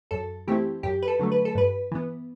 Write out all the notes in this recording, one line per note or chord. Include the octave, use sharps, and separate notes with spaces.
F#2 A4
E3 A3 C4 E4 G4
F#2 G4
B4
A4
D3 F#3 A3
B4
A4
G2 B4
E3 B3